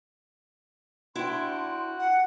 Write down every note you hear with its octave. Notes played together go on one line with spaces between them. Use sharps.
D4 E4 F#4 G5 C6
F#5